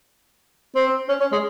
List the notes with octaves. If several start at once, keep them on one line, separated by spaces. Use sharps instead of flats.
C4
C#4
C#4
G#3